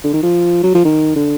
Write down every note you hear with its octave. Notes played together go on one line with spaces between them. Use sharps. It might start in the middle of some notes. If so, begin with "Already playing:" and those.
D3
D#3
F3
F#3
F3
D#3
D3